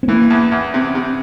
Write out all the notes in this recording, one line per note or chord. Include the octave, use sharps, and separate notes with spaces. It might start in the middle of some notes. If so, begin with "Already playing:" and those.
C4
E3 A#3
E2
E2
C3
C3